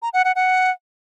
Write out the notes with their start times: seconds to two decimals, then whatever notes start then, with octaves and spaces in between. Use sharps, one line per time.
0.02 A#5
0.13 F#5
0.25 F#5
0.36 F#5